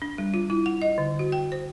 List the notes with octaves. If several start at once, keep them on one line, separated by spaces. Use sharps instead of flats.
D4
G3
F4
E4
F#5
D#5
D3
F#4
G5
C5